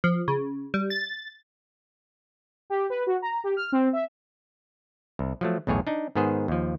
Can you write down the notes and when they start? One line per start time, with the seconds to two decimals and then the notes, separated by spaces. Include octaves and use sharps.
0.04 F3
0.28 C#3
0.74 G3
0.90 A6
2.70 G4
2.90 B4
3.07 F#4
3.22 A#5
3.44 G4
3.57 F6
3.72 C4
3.93 E5
5.19 C2
5.41 F3 F#3 A3
5.67 B1 E2 A2 G#4 C#5
5.87 D4 D#4
6.15 G#2 D#3 B3 G#4 C5
6.48 D#2 F3